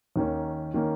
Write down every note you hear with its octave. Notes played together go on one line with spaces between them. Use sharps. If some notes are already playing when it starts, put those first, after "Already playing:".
D#2 D#3 A#3 C#4
D#3 A#3 C#4